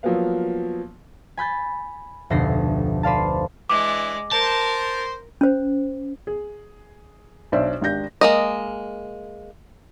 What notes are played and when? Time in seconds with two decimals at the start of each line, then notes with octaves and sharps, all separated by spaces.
0.03 F3 F#3 A#3 B3 F5
1.37 G#5 B5 G6 A6
2.30 F1 D2 B2 A4 A#6 C7
3.03 B4 C5 D5 F5 A5
3.70 E3 G#3 D4 D6
4.32 A#4 C5 A5
5.41 C#4 C5
6.27 G#4
7.52 B1 D4 C5 D5 E5
7.81 G#1 D4 G4 G6 A#6
8.21 G#3 A#3 D#5